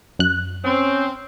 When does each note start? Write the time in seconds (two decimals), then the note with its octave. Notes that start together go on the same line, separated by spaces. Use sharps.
0.19 F#2 F#6
0.64 C4 C#4